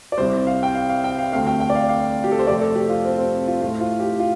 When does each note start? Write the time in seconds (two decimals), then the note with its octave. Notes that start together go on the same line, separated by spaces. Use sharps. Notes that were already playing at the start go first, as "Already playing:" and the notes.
0.12 D5
0.17 C2 C3 G3 C5
0.47 F5
0.63 G5
0.75 F5
0.89 F5
1.04 G5
1.18 F5
1.32 D2 C3 A3 F5
1.47 G5
1.60 G5
1.70 D5
1.75 F5
1.89 F5
2.24 G4
2.32 A4
2.39 C5
2.47 F2 C3 A3 D5
2.61 A4
2.75 G4
2.89 F4
3.05 C4
3.19 C4
3.48 F4
3.61 A2 A3 F4
3.80 F4
4.00 G4
4.19 F4